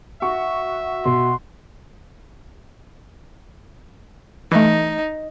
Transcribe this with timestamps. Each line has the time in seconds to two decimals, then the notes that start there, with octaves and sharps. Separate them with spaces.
0.22 F#4 E5 C#6
1.05 B2 C6
4.52 E3 A3 D#4